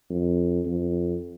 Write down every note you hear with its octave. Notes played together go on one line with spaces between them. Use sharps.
F2
F2